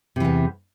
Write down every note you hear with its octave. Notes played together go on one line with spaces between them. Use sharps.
E2 C3 E3